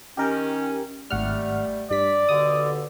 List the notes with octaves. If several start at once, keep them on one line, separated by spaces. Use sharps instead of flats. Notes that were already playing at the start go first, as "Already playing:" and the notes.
D#3 C#4 G4 A#4 G5
G#1 G3 A3 F#5 F6
G2 D5 B6
D#2 B2 D3 D#6